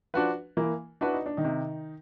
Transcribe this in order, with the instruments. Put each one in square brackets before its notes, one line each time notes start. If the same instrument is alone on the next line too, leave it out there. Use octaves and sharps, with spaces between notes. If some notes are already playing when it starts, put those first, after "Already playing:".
[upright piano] F3 F4 [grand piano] D4 F#4 B4
[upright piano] E3 E4 [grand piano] A#3
[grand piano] D4 F#4 B4 [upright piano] E4
[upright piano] D#4
D4
D#3 D#4
[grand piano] C3